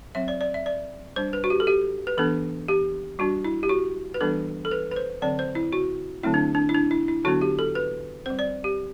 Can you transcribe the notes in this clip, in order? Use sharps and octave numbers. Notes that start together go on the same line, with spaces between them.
F#3 C4 E5
D5
D5
E5
D5
G3 D4 C5
B4
F#4
G4
A4
G4
B4
E3 B3 D4 A4
G4
G3 D4 F#4
E4
G4
F#4
B4
E3 G3 B3 D4 A4
A4
B4
B4
C5
D3 F#3 C4 D5
C5
E4
F#4
D3 F#3 A3 C4 E4
D4
D4
E4
D4
E4
E4
D3 F#3 B3 D4 F#4
G4
A4
B4
G3 C4 C5
D5
G4